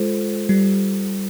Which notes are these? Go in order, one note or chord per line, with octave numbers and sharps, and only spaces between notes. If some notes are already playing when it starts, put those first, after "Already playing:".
Already playing: G#3 F4 A4 C5
G3